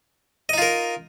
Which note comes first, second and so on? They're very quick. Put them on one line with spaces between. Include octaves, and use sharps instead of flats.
D#5 D#4 F4 A#4